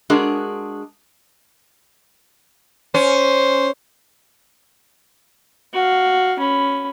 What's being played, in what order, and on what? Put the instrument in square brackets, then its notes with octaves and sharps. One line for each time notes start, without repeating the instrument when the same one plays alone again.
[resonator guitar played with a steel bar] G#3 D4 F#4 G#4 A#4
[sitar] C#4 [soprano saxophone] C5
[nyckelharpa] F#4 F5
C#4 B5